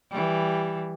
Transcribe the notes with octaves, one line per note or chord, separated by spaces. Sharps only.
E3 G3